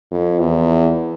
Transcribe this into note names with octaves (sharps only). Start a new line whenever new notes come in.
F2
E2